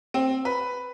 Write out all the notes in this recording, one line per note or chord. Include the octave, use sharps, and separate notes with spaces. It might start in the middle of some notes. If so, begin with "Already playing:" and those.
C4
B4